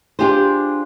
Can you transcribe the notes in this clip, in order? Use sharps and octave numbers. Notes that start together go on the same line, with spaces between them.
D4 F4 G4 G#4 C5